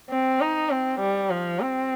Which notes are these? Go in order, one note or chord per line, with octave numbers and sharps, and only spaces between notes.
C4
D#4
C4
G3
F3
C4